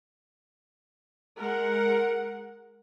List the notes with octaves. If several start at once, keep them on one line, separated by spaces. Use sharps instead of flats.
G#3 A#4 F#5